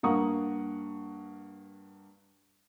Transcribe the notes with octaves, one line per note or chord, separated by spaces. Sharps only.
G2 A#3 F#5 A#5 C#6 D#6